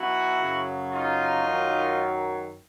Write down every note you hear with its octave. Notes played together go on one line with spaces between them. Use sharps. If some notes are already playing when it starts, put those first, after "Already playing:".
Already playing: B2 F#3 E4 F#4
F#2 C#3 F#3
D#4 F4
F#2 D#3 F#3